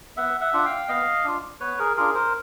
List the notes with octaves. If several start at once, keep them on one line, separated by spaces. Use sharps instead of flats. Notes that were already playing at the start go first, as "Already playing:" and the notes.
B3 E5 F#5
E5 F#5
D4 F4 F#5
F5 G5
B3 D#5 F5
D4 F4
B3 B4 C#5
G#4 A#4
D4 F4 G#4 A#4
A#4 C5